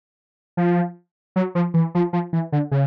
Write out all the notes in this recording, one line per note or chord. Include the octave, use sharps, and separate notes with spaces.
F3
F#3
F3
E3
F3
F3
E3
D3
C#3